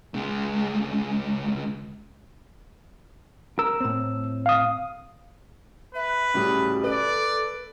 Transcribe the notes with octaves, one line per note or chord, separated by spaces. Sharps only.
C#2 G#3
A#4 E6
A2 C4
F5 D#6
B4 E5
A2 C#3 G3 F#4
A4 B4 D5